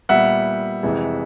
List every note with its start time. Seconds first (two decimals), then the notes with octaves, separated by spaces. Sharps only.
0.09 A#2 G3 B3 E5 F#5
0.83 F2 C3 E3 G#3